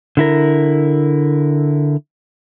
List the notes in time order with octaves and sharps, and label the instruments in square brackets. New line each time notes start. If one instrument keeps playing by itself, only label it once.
[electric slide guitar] D3 E4 A#4